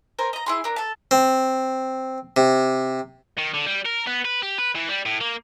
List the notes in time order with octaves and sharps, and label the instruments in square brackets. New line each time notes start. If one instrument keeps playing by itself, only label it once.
[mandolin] A#4 C5 G#5
D#5 A#5
E4 G#4 C6
D4 A#4
A4 A5
[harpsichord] C4
C3
[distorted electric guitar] D#3
D3
G3
A#4
B3
B4
G4
B4
E3
G3
A2
A#3